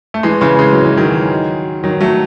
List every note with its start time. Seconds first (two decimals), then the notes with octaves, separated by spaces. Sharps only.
0.14 A3
0.23 E3 G#3
0.41 C#3 E3
0.59 G#3
0.72 F#3
0.85 E3
0.97 D#3 F#3
1.83 D#3 F#3
2.01 F#3 A3